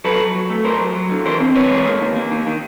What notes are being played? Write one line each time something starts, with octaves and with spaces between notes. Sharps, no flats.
F#3 A4 B4
F#3
F#3
A3
F#3 A#4 C5
F#3
F#3
D3
E3 A#4 C5
C4
E3 B4 C#5
G#3
A#3
D#3
A#3
D#3
D#3